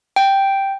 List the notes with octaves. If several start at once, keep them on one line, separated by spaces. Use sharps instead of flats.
G5